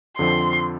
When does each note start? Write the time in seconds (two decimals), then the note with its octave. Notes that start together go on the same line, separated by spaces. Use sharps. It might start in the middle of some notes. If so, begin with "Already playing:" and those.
0.18 F2 D3 F3 C4 C6